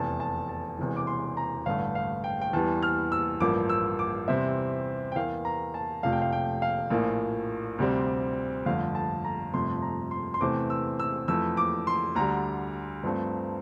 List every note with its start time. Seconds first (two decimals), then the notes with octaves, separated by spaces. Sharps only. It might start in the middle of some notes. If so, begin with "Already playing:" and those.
Already playing: F1 E2 C3 A5
0.20 A5
0.49 A5
0.79 E1 E2 C3 E3
0.96 D6
1.07 C6
1.37 A#5
1.66 A1 G2 D3 A3 F5
1.95 F5
2.24 G5
2.41 G5
2.53 E2 E3 G3 A5
2.82 F6
3.12 E6
3.40 A1 G2 F3 A#3 D6
3.69 E6
3.99 D6
4.28 E2 C3 G3 C4 E5
5.12 G5
5.15 E2 E3 A#3 F5
5.45 A#5
5.74 A5
6.03 F1 F2 C3 F3 A3 F5
6.12 G5
6.22 F5
6.32 G5
6.62 F5
6.91 A#1 A2 F3 A#3
7.78 D2 C3 G3 C4
8.66 G1 F2 D3 A3 F5
8.95 A5
9.25 A#5
9.53 G1 F2 C3 F3 A3 C6
9.82 A#5
10.11 C6
10.34 C6
10.40 E2 C3 E3 A3 C4 D6
10.70 E6
10.99 E6
11.28 F2 E3 A3 E6
11.57 D6
11.87 C6
12.15 D2 D3 G3 A#5
13.03 G2 F3 A3 C4